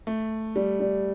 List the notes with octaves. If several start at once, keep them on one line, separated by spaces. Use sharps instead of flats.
A3
G3
G3